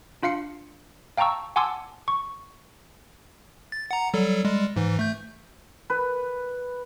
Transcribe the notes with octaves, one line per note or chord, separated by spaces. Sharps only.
D4 F4 F5 C7 C#7
F5 G5 A5 A#5 C#6 E6
F#5 G#5 A5 C6 D6 E6
C#6
A6
F#5 A#5
F#3 G3 A4
G3 G#3
G#2 E3
A3 G6
B4